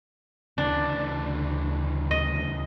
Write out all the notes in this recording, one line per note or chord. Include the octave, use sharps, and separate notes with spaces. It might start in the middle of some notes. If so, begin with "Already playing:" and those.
D2 C#3 E3 D4
D#5